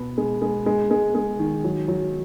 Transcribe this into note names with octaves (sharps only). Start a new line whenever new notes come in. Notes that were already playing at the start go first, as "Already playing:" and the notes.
Already playing: B2 B3
G#3
G#3
G#3
G#3
G#3
D#3
F#3
F#3